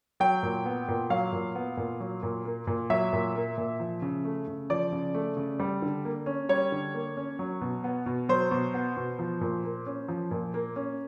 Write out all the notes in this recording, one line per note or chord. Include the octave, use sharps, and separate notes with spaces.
F#3 G5
A#2
B3
A#2
F#3 F5
A#2
B3
A#2
F#3
A#2
A#3
A#2
F#3 E5
A#2
A#3
A#2
F3
C#3
A3
C#3
F3 D5
C#3
A3
C#3
G3
D3
A#3
C#4
G3 C#5
D3
A#3
C#4
F#3
B2
B3
B2
F#3 C5
B2
B3
B2
F3
A#2
A#3
C#4
F3
A#2
A#3
C#4